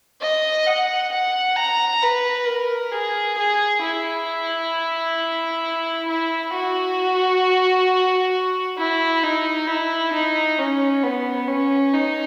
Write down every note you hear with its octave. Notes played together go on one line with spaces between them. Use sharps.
D#5
F#5
F#5
A#5
B4
A#4
G#4
G#4
E4
E4
F#4
E4
D#4
E4
D#4
C#4
B3
C#4
D#4